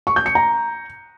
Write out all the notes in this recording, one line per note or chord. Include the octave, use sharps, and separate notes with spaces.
C#6
G6
C#7
A#5